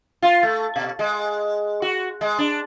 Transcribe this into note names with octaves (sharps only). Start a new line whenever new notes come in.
F4
A3
B2
G#3
F#4
G#3
D4